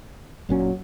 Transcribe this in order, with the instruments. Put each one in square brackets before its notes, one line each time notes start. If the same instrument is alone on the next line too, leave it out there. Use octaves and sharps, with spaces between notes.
[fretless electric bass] F#1 A#2 C#4 [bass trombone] F#3